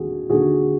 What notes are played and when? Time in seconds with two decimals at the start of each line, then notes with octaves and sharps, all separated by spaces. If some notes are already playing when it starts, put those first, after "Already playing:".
Already playing: D#2 D3 F#4 G#4
0.29 D#2 D3 F#4 G#4